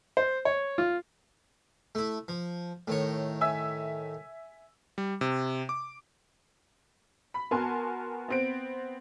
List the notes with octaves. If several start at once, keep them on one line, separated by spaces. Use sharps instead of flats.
C5
C#5
F4
A3 E4
F3
A2 D#3 C#5
E5 G#5 E6
G3
C3
D6
B5
B3 F#4 A#4 G#5 A5 C6
B3 C4 D7